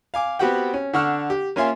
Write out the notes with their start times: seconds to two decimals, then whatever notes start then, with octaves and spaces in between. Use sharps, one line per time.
0.14 F5 G#5 D6
0.39 B3 C4 F#4 G4 F#5 G5
0.74 C#4
0.93 D3 D4 F#5 C#6 E6 F6
1.30 G4
1.56 A#3 C#4 F4 E5 G#5 C6